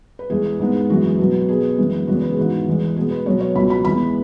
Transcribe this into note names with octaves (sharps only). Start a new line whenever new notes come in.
B4
E2 E3 G#3 G#4
G#2 G#3 B3
F#2 E3 G#3 B3 F#4
B2 F#3 B3
B2 B3 G#4
F#2 E3 G#3 B3
E2 C#3 G#3 B3 F#4
B4
G#4
G#2 E3 B3 F#4
E2 E3 G#3
B2 G#3 B3 G#4
B4
B2 F#3 B3 C#5
C#5
C#2 B2 F#3 B5
B5
E2 E3 G#3 B3 B5